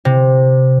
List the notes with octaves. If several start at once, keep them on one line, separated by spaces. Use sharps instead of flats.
C3